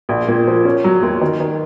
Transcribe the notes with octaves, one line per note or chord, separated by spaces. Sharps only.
A#1
A#2
F3
C#4
F#3
D#2
D#3
D#3